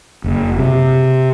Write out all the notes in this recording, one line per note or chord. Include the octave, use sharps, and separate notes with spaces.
F#1
C3